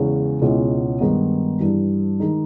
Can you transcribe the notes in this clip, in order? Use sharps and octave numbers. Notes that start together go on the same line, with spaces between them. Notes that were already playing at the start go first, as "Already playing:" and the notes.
Already playing: E2 C#3 G#3 C#4
C#2 B2 G#3 C#4 E4
G2 D#3 G#3 B3 D#4
G2 E3 G3
D#3 G#3 D#4